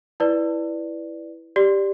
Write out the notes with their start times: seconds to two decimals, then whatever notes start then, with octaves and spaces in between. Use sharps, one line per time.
0.20 E4 B4 D5
1.56 G4 D5